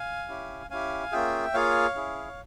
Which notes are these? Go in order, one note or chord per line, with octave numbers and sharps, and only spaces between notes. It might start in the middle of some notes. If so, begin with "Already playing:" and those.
Already playing: F5 G#5
C#4 E4 G4
C#4 E4 G4 F5 G#5
A#3 C#4 F4 G#4 E5 G5
A#3 F4 G#4 C#5 F5
C#4 E4 G#4